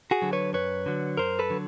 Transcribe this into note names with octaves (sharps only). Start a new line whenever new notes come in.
F#4 G#4
D3 F#3
B4 C#5
F#2 B4 C#5
D3 F#3
F#2 A#4 C5
A4 B4
D3 F#3